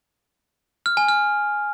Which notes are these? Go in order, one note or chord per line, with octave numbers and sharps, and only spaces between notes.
F6
G#5
F6